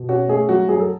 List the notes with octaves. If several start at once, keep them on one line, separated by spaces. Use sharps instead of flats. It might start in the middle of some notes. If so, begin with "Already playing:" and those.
Already playing: B2
C#4 F#4
A3 G#4
F#3 F#4
F#3 G#4
A4